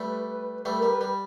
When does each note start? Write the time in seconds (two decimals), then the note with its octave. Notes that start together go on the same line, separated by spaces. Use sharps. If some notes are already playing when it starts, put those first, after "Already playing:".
Already playing: G3 A3 B4
0.65 G3 A3 B4
0.77 A#4
0.82 G3
0.89 B4
1.01 G3